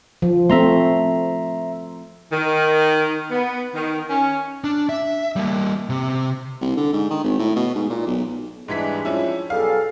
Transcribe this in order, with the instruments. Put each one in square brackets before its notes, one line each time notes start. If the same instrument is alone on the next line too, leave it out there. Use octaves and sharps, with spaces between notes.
[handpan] F3
[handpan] A3 C4 [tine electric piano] E5 A#5 C6
[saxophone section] D#3
B3
D#3
C#4
[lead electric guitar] D4
E5
G3 A#3
C3
[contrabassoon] C2
D3
G#2
D#3
G#1
A2
B2
G#2
A#2
B1
[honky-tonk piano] G#2 E3 B6 [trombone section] G3 G#3 D4
[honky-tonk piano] F3 C#4 E4
[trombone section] B1 G3 G#4 [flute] A4 [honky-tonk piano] F5